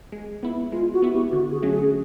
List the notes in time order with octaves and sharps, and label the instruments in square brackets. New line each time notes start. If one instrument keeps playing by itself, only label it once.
[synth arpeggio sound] G#3
B3 E4
[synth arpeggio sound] G#3 [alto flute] F4
[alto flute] F#4
[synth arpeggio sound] B3 E4
[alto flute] G4
[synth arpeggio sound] D3 [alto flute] F#4
[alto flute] G#4
[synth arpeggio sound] F#3 A3 C#4
[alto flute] G#4